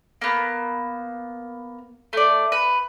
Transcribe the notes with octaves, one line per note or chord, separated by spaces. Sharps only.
A#3 B3
A3 D5
B4